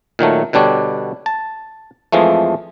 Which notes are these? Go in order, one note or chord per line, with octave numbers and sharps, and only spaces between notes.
A#2 D#3 F#3 A3
B2 D3 G3 D4 C#5
A5
F2 E3 F3 G#3 A3